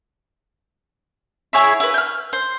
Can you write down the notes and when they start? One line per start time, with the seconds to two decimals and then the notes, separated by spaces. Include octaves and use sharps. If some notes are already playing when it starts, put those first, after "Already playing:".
1.53 E4 G#4 C#5 E5
1.80 E4 B4
1.94 F6 G6
2.33 C5